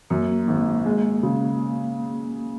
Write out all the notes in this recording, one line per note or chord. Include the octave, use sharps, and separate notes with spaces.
F#2 A#3
G#1
G#3
C#3